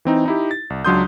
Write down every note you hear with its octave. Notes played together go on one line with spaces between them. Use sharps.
E3 C4 D#4
D#4 E4 G4
A6
C2
C#2 F#3 D4 C6 D#6 G6